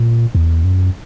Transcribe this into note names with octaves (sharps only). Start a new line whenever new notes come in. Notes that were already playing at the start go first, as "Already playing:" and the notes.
Already playing: A#2
E2
F#2